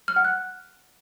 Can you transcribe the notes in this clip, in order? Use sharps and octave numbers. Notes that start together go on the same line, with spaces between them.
F6
F#5
F#6